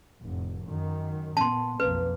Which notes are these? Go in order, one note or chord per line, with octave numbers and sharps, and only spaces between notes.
F1 A2
F#2 D#3
A#2 B3 A5 C6
B1 F2 A#3 B4